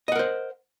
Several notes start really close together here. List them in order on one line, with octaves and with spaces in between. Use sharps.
D#5 F#5 A#4 C5